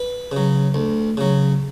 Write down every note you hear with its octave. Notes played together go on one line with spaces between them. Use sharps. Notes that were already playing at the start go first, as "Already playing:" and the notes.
Already playing: B4
C#3
F#3
D2
C#3 F#3